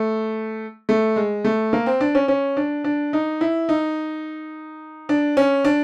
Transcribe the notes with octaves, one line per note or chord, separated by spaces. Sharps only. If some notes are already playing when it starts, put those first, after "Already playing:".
Already playing: A3
A3
G#3
A3
A#3
C4
D4
C#4
C#4
D4
D4
D#4
E4
D#4
D4
C#4
D4